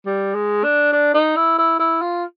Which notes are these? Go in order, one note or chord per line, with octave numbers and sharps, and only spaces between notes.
G3
G#3
D4
D4
D#4
E4
E4
E4
F4